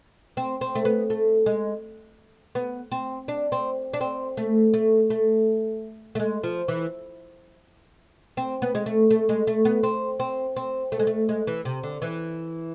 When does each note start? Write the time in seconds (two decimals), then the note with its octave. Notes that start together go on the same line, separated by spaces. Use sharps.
0.37 C4
0.61 C4
0.75 A3
0.85 B3
1.10 A3
1.46 G#3
2.55 B3
2.92 C4
3.28 D4
3.52 C4
3.94 D4
4.01 C4
4.37 A3
4.74 A3
5.10 A3
6.15 A3
6.20 G#3
6.44 F3
6.68 E3
8.37 C4
8.62 B3
8.75 G#3
8.86 A3
9.11 A3
9.29 G#3
9.47 A3
9.65 B3
9.83 C4
10.20 C4
10.56 C4
10.92 A3
10.99 G#3
11.07 A3
11.29 G#3
11.47 E3
11.65 C3
11.83 D3
12.02 E3